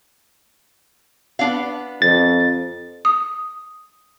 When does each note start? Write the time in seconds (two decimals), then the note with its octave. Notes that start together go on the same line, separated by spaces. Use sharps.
1.39 B3 D4 F5
2.02 F2 A6
3.05 D#6